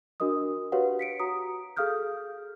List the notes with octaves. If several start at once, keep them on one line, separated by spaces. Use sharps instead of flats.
D4 F#4 A#4 D#5 D#6
F#4 G4 B4 C#5 F5 F#5
B6 C#7 D7
F#4 A#5 D#6
G#4 A4 F5 D#6 F6 G6